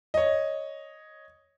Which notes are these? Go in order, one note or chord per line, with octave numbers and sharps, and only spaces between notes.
C#5 D#5